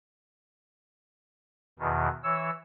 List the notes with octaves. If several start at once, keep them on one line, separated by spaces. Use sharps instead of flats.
E2 B2 D#3
E3 C#5 E6